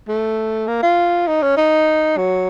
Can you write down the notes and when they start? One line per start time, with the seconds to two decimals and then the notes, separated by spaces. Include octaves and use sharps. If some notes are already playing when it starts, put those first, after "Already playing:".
0.08 A3
0.68 A#3
0.83 F4
1.28 D#4
1.42 C#4
1.57 D#4
2.17 F#3